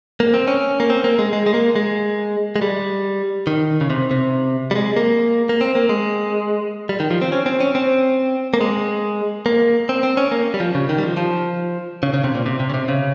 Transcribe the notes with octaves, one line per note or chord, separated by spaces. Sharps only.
A#3
C4
C#4
A#3
C4
A#3
G#3
G#3
G#3
A#3
G#3
G#3
G3
D#3
C#3
C3
C3
G3
G#3
A#3
A#3
C4
A#3
G#3
G3
D#3
F3
C4
C#4
C4
C#4
C4
A#3
G#3
A#3
C4
C4
C#4
A#3
G3
F3
C#3
D#3
G3
F3
F3
C#3
C#3
C3
A#2
C3
C3
C#3
C3
C#3